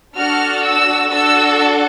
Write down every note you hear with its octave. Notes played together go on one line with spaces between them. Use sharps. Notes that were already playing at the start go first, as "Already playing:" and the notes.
D4 F#4 A4 F6
E6
D4 F#4 A4 E6